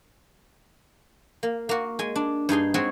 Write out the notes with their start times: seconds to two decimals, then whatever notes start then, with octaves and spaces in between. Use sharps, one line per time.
1.43 A#3
1.69 A#3 F#4
1.99 G#3 G#5
2.16 D4
2.49 G2 D#4 G#4 C6
2.74 G#3 C4 F#4 G#4 C#5